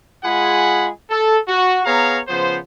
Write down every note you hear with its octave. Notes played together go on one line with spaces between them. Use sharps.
G#3 F4 G#4 F#5 G#5 B5
A4
F#4
B3 G#4 C#5 F5 A#5
C#3 F3 B3 C5